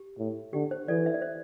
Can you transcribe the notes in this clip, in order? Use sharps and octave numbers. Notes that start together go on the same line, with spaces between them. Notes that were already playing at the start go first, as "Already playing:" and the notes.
Already playing: G4
A2
D3 G4
C5
E3 A4 D5
E5
D5
C5 E5